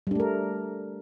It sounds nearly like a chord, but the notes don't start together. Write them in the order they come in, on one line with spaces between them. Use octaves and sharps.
G3 D4 A3 A#4